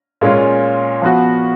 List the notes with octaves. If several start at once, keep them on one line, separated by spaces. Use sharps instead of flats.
A#2 G#3 C#4 F4
F3 B3 F#4